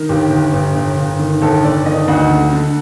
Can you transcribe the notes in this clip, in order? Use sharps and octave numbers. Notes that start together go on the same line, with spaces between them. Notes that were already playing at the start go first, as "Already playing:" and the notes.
Already playing: D#3
G1 G4
G1
G1
G1
G1
D#3
G1 A4
G1 D5
D#3 D#5
D2 F#5
D3
D3